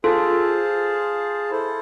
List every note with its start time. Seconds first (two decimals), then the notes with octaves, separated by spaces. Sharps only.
0.04 F4 G#4 A4 C5 F5 A5
1.51 E4 A4 C5